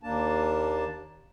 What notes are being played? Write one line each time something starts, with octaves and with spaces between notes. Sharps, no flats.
D#2 A#3 D4 A5